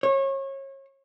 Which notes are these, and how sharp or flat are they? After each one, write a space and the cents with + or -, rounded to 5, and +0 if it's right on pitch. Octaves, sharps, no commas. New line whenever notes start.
C#5 -30